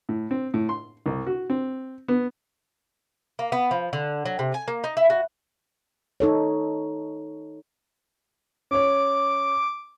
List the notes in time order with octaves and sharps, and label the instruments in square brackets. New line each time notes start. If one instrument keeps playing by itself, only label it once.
[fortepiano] A2
C4
A2
C6
C2
F#4
C4
B3
[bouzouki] A#3
B3
F3
D3
F#3
C3
G#5
A#3
D#4
E4
F#4
[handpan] D#4 A4 C#5
[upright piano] C#4 C#5 [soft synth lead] D6